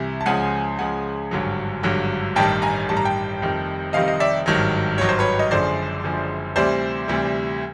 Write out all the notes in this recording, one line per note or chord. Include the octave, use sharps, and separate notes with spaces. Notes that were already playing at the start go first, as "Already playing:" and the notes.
Already playing: C2 C3 E3
A5
C#2 C#3 F3 G#3 F#5 G#5
C#2 C#3 F3 G#3 F#5 G#5
G#1 G2 D3 F#3
G#1 G2 D3 F#3
A1 G2 D#3 G3 G5 A5
G#5 A#5
A1 G2 D#3 G3 A5
A#5
G5 A5
F1 F2 C3 D#3 G3
F1 F2 C3 D#3 G3 D#5 F5
D#5
D5 E5
G#1 G2 D#3 F#3
G#1 G2 D#3 F#3 C#5
C5
B4 C#5
D#5
F#1 F#2 D3 F3 G#3 C5 D5
F#1 F#2 D3 F3 G#3
D2 C3 E3 G3 C5 D5
D2 C3 E3 G3